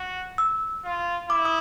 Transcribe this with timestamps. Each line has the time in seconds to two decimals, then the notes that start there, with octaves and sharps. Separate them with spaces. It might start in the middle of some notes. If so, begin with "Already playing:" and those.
Already playing: F#4
0.38 E6
0.85 F4
1.30 E4 D6
1.45 D#6